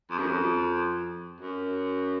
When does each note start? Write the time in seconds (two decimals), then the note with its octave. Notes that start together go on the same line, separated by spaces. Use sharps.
0.11 F2
0.19 F#2
0.27 F2
1.41 F#2